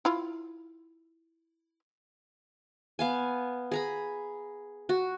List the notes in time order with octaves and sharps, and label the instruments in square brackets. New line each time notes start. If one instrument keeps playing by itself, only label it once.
[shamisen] E4 F4
[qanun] B3 F5 G#5
G#4 A#5 B5
F#4